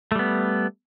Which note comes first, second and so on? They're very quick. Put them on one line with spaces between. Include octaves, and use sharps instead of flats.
A3 G3 B3